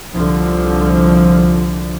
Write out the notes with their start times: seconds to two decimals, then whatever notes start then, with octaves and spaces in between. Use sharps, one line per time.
0.15 C2 D3 F3